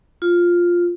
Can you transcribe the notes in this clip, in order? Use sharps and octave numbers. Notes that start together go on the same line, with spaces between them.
F4